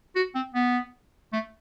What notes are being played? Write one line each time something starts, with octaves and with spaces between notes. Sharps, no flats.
F#4
C4
B3
A3